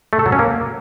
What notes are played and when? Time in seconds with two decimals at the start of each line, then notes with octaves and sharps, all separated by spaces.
0.13 A3
0.19 A4
0.26 F#3
0.32 C#4
0.39 A#3